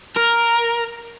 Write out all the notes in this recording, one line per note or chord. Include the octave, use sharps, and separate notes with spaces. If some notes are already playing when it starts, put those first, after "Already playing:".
A#4